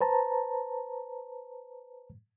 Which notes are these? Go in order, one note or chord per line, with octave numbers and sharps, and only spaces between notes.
B4 C5 A5 A#5